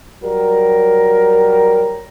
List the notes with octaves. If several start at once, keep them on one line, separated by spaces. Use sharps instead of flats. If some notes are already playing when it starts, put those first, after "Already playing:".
F#3 G3 A#4